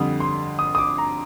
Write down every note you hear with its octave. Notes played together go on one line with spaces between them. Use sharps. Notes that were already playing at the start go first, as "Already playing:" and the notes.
Already playing: F2 D3 G3 D#6
C6
D#6
D#6
D6
A#5